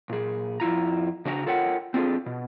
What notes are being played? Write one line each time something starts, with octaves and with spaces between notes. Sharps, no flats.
A#2 G#4
F2 E4 F4 A#5
C#3 D4 F#4 D#5 A#5
F4 A4 A#4 C#5 F#5 G5
C4 D4 F4 F#4 G#4 A4
B2